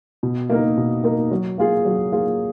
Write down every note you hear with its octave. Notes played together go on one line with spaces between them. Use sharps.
B2
A#3 D#4 A#4
B2
A#3 D#4 A#4
F#3
A#3 F4 G#4
F#3
A#3 F4 G#4